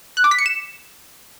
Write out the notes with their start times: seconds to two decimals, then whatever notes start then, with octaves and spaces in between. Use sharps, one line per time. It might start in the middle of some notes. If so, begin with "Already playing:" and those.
0.17 F#6
0.24 D6
0.31 B6
0.39 C#7
0.46 E7